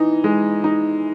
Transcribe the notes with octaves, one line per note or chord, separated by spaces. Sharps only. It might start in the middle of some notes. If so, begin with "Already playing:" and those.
Already playing: E3 D#4
G#3
D#4